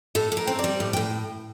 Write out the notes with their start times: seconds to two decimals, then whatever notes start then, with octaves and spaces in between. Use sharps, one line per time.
0.15 A2 A4
0.32 A2
0.37 A#4
0.47 C4
0.59 D5
0.64 G3
0.80 A2
0.93 G5
0.97 A2